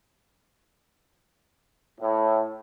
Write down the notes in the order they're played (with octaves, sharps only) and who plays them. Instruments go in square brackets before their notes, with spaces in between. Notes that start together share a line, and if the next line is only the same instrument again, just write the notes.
[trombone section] A2